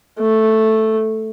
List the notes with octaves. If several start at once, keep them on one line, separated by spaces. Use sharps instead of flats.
A3